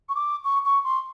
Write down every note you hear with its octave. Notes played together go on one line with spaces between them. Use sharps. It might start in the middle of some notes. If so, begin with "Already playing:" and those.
C#6
D6
C#6
C#6
C6